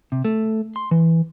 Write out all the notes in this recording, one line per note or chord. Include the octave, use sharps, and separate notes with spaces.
C3
A3
C6
E3